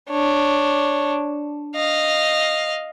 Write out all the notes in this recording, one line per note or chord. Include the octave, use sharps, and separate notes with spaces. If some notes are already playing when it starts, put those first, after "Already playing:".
D4 C#5
D#5 F5